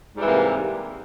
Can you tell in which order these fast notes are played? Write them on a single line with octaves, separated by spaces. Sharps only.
G#2 G3 E3 C3 A#3